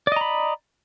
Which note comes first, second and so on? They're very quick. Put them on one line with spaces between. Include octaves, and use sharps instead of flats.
D5 D#5 A#5 B5